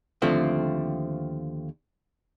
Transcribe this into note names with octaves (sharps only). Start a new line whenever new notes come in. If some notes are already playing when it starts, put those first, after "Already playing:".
D#2 D3 F3 A3 C4